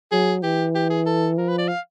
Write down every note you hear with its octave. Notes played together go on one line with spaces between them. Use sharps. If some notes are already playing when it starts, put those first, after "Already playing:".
F#3 G#4
E3 G4
G4
G#4
A4
F3 A#4
B4
D5
F5